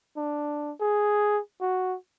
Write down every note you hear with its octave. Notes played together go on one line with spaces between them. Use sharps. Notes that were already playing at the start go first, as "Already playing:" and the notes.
D4
G#4
F#4